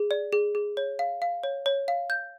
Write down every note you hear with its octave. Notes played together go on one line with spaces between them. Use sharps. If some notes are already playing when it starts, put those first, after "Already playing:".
Already playing: G#4
D5
G#4
G#4
C#5
F5
F5
C#5
C#5
F5
G6